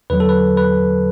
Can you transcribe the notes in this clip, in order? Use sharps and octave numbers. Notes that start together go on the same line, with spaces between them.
E2 D3 F#3 B4
A4
B4
B4